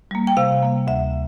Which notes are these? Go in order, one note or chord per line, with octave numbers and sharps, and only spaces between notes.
G3 A#3
G5
C3 F5
G3 A#3
D2 E5